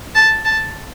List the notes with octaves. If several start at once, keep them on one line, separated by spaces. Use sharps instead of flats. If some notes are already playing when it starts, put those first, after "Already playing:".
A5
A5